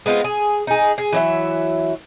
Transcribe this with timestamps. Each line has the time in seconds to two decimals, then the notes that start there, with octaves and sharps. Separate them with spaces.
0.06 G#3 B3 C4 F4
0.24 G#4
0.67 D#4 G#4
0.98 G#4
1.12 E3 F#3 E5